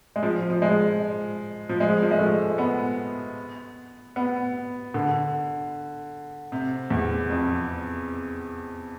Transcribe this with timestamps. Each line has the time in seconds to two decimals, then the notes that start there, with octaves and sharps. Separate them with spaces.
0.16 G#3
0.23 F3
0.50 F3
0.62 G#3
1.69 F3
1.80 G#3
2.02 F3
2.11 G#3
2.18 A3
2.58 B3
4.16 B3
4.94 D3
6.52 C3
6.90 E2
7.30 F2